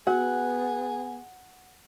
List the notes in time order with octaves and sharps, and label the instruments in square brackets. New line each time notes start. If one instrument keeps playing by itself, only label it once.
[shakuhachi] B3 [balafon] F#4 [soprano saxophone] G#4 [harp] F#5